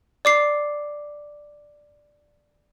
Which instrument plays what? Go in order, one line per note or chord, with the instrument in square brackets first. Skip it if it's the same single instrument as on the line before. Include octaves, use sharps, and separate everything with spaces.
[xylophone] D5 D6 C7